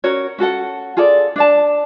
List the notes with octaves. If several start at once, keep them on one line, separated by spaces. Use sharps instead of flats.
C#4 F#4 A#4 C#5
C#4 F#4 A4 F#5
F4 G#4 A4 D5
D4 D5 A5